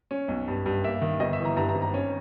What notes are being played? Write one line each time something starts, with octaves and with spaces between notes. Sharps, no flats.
C#4
B1
G2
G2
A#3 E5
D#3
G1 D#5
E5
E3
A#5
G2 A#5
A#5
G#1
A#5
C#4